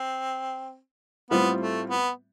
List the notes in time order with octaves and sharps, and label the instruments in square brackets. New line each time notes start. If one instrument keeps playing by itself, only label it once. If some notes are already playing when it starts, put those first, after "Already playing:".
Already playing: [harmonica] C4
[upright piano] A2 G3 C4 F4 [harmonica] B3
[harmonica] A3
B3